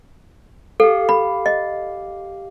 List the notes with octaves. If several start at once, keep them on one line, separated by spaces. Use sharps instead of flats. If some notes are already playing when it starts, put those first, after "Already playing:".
G4 A4 F5
B5
D#5